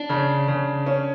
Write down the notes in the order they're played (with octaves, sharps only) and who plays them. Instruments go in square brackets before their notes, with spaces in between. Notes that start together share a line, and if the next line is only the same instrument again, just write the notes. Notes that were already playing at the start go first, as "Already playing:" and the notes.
Already playing: [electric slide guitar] D4
[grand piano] C#3
C#3
C#4